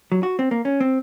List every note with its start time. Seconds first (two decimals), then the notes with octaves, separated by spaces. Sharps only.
0.12 F#3
0.23 F#4
0.39 C4
0.51 A#3
0.65 C#4
0.81 C4